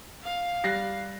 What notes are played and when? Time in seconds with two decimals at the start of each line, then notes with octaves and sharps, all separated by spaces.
0.23 F5
0.64 G3 F#6 A#6 C7